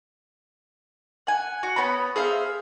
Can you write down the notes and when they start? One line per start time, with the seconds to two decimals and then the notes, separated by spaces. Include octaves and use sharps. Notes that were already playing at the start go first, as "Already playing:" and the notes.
1.27 F#5 G#5
1.63 F#4
1.76 B3 C#5 B5
2.16 G#4 C5 E5 F5